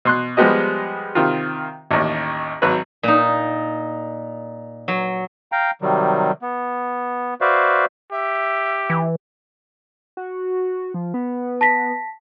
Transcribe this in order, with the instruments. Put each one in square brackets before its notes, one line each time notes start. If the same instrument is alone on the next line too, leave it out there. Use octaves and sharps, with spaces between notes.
[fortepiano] B2 C6 F#6
F3 G3 G#3 B3 G4 D#5
C3 D#3 F4
A1 D#2
G#1 F#3 B4
[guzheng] A#2 D#4
F#3
[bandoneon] F5 G5 A#5
C3 D#3 F#3 G3
B3
F#4 B4 C5 D5 E5 F5
[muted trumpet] G4 [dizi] E5
[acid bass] E3
[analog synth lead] F#4
F3
B3
[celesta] A5 A#6 B6